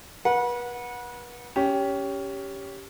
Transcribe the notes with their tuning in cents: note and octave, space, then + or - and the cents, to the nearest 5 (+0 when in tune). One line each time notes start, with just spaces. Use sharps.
B4 -35 F#5 -20
C#4 +15 G4 +0